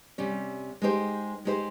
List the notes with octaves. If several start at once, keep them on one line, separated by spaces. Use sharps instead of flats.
C3 G3 C#4
G#3 D#4 G4 C5
G#3 D#4 G4 C5